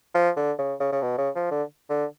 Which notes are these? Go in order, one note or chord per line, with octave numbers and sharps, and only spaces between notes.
F3
D3
C#3
C#3
C#3
B2
C#3
F3
D3
D3